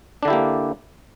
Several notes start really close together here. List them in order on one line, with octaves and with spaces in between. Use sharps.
D4 D3 E4 G4 A#3